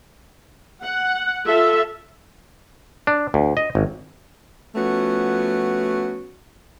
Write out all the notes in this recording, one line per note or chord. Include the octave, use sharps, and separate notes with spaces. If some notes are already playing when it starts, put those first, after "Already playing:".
F#5
F4 A4 E5
D4
D2
D#5
G#1
F3 A3 B3 C#4 F#4